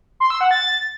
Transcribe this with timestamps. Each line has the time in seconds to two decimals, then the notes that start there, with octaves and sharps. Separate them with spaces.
0.20 C6
0.30 E6
0.41 F#5
0.51 A6